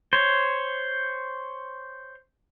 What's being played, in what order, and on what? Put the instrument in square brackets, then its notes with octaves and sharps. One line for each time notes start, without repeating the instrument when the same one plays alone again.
[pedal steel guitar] C5 C#5